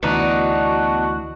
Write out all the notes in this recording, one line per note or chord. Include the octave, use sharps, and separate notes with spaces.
D2 E3 B3 D4 D#4 F#4